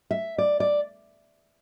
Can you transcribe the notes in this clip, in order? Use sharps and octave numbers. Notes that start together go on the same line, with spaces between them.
E5
D5
D5